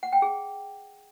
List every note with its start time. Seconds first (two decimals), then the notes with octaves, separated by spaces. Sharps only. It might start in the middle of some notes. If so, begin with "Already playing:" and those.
0.03 F#5
0.13 G5
0.22 G#4